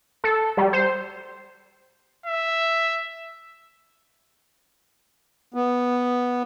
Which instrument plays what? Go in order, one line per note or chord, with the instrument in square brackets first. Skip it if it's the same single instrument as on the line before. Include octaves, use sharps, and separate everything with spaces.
[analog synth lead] A4
G3
C5
[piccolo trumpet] E5
[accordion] B3